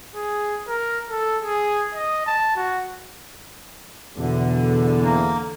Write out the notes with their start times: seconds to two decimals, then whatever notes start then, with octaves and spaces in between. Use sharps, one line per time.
0.16 G#4
0.68 A#4
1.10 A4
1.42 G#4
1.95 D#5
2.26 A5
2.56 F#4
4.18 E2 B2 D3
5.03 A#3